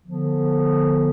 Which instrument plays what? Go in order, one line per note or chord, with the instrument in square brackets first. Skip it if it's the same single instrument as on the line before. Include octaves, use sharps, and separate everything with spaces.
[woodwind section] D3 F3 B3